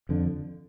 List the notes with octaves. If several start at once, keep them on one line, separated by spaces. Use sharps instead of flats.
F2 D3